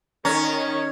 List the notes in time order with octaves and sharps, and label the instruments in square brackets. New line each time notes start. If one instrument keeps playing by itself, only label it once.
[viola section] D#3 C#5 [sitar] C#4 [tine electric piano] A#5